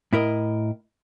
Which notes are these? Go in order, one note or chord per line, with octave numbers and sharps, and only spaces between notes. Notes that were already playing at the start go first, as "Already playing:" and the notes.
A2 E4 A#4 D#5